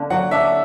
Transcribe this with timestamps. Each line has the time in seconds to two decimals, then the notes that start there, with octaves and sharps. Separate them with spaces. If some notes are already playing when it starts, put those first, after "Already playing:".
Already playing: D3 A#3
0.10 F#3 F#5
0.31 D4 E5